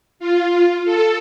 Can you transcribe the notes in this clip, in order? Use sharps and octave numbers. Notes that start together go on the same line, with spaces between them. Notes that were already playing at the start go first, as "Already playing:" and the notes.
F4
A4